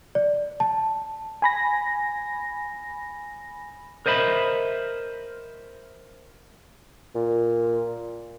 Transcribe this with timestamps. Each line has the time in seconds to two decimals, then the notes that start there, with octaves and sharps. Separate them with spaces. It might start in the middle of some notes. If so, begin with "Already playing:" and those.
0.15 D5
0.60 A5
1.42 G#5 B5 A#6
4.06 A#4 C5 D#5 E5 B5
7.15 A#2